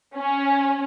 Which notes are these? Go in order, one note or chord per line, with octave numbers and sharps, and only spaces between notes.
C#4